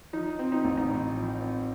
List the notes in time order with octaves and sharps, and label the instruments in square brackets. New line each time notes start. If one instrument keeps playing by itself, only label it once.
[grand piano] F3 [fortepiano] D#4
[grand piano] C4
[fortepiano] D#4
[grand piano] A1
[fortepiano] D#4
[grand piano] A2
F3
C4